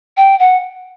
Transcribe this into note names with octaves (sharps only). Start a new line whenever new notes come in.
G5
F#5